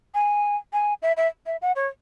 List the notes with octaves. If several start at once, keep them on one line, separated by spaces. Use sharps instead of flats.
G#5
G#5
E5
E5
E5
F#5
C#5